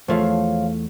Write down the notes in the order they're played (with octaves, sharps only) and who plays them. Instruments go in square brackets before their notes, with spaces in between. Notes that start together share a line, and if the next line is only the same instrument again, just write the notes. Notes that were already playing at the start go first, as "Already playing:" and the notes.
[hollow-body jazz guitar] E2 A3 [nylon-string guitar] F3 C#5 F5